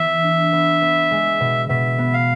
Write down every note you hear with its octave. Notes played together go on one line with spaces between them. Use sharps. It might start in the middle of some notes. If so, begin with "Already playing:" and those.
Already playing: E3 B3 E5
D4
B3
B3
G#3
B2
B2 E5
B3
F5